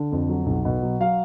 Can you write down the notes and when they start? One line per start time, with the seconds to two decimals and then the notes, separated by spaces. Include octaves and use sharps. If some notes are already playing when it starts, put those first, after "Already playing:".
Already playing: D3
0.12 F2
0.28 F#3
0.46 B1
0.65 B2
0.82 F#3
1.00 F#3 F5